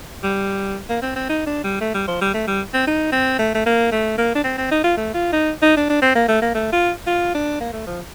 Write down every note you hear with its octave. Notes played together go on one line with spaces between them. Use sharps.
G3
A#3
C4
C4
D#4
D4
G3
A3
G3
F3
G3
A3
G3
C4
D#4
C4
A3
A3
A#3
A3
A#3
D4
C4
C4
D#4
F4
A3
F4
D#4
D#4
D4
D4
C4
A#3
A3
A#3
A3
F4
F4
D4
A#3
A3
F3